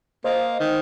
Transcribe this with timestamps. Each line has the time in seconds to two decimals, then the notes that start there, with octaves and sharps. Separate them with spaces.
0.24 A#3 C5 D#5
0.60 D#3